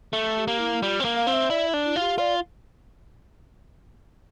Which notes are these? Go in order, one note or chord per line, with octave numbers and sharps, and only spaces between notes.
A3
G4
A#3
E4
G3 F4
C4
A#3
F5
C4
E5
E4 D5
D4
E4
F4
G4
F4 D5